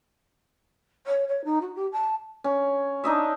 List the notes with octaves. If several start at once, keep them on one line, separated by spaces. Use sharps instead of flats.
C#5
C#5
D#4
F#4
G4
A5
C#4
D4 D#4 D#5 E5